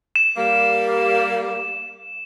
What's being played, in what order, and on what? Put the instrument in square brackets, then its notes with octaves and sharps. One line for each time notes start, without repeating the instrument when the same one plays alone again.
[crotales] E7
[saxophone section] G3 A#3